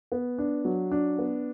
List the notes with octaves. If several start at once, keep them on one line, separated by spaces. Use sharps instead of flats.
B3
D4
F#3
D4
B3